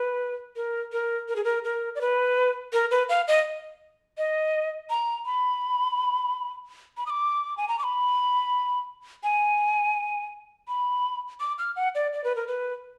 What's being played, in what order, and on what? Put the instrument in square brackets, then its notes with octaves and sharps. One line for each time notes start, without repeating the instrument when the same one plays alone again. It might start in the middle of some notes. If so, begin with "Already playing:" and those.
Already playing: [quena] B4
A#4
A#4
A#4
G#4
A#4
A#4
D5
B4
A#4
B4
F5
D#5
D#5
A#5
B5
B5
D#6
D6
G#5
A#5
D6
B5
G#5
B5
D6
F6
F#5
D5
D5
B4
A#4
B4